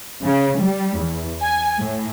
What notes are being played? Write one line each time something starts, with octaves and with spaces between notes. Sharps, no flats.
C#3
G3
E2
G#5
A2